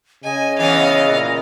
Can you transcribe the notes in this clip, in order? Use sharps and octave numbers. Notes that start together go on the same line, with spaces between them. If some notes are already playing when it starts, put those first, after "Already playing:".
C#3 D#5 G#5
E3 B3 C#4 F5
A#2 A#6